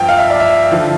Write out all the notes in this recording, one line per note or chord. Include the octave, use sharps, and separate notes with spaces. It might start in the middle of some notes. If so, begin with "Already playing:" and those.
Already playing: G2 F3 G5
F5
E5
D5
E5
D3 F3